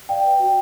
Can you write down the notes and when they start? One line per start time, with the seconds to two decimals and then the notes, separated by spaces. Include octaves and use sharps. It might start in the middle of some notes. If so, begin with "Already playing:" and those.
0.09 D5 F5 G5
0.24 B4
0.40 F#4